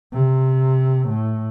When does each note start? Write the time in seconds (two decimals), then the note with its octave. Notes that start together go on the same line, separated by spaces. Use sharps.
0.13 C3
1.09 A2